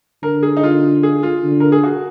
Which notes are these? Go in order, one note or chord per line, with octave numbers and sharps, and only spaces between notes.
D3 A#4
G#4
D#4
F4
G#4
F4
D3
A#4
G#4
F#4